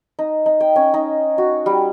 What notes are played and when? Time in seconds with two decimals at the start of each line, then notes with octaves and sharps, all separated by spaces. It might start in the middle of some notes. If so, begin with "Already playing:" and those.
0.19 D#4
0.46 D#4
0.60 G5
0.76 C#4
0.94 D#4
1.38 F#4
1.66 G3